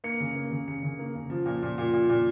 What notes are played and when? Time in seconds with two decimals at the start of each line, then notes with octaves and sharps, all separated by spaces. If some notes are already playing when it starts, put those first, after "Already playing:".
0.04 A#3 C#7
0.20 C#3
0.36 A#3
0.51 C#3
0.68 C#3 C#7
0.83 C#3
0.99 A#3
1.15 C#3
1.30 F3
1.46 A#2
1.63 A#2
1.78 A#2
1.93 A#2
2.09 A#2